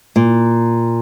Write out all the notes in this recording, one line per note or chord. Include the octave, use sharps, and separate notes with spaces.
A#2